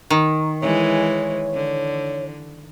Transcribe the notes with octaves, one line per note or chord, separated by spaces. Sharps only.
D#3
E3 G#3 C#5
D3